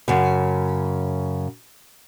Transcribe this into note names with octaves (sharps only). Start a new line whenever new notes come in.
F#2 C#3